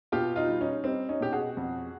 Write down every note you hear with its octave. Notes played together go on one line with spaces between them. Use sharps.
B2 F4 G4
D#4 F4
G3
C#4 D#4
G3 C4
C#4 D#4
B2 G4
F#4 G#4
F2